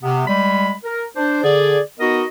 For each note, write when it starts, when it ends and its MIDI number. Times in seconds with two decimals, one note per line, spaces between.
0.02 0.22 48
0.02 0.22 59
0.26 0.71 55
0.26 0.71 56
0.26 0.71 83
0.83 1.04 70
1.16 1.42 62
1.16 1.42 72
1.42 1.78 50
1.42 1.78 68
1.42 1.78 74
1.99 2.22 59
1.99 2.22 63
1.99 2.22 66
1.99 2.22 70
1.99 2.22 75